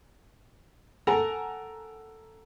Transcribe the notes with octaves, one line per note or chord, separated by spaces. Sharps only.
A4 A#4 F#5 G#5 A#5